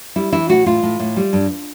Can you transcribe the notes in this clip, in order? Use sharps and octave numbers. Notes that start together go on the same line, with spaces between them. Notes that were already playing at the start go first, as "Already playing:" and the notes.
G3 E4
E3 E4
A2 F#4
A2 F4
A2
A2
G3
G2